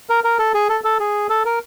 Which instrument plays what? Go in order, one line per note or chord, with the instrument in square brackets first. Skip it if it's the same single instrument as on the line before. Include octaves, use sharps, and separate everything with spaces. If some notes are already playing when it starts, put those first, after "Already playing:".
[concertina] A#4
A#4
A4
G#4
A4
A4
G#4
A4
A#4